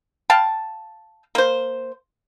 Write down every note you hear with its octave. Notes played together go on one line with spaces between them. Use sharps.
F5 G5 A5
A#3 C5